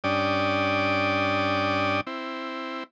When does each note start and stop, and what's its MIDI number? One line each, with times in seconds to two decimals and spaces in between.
0.04 2.01 43
0.04 2.01 61
0.04 2.01 62
0.04 2.01 74
0.04 2.01 79
0.04 2.01 87
2.07 2.84 60
2.07 2.84 64